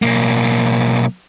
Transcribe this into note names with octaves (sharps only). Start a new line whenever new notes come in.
B1 A#3